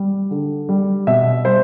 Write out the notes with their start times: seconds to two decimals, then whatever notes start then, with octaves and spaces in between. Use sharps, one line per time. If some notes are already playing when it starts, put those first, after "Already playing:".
Already playing: G3
0.31 D3
0.69 G3
1.07 B2 E5
1.45 G3 C5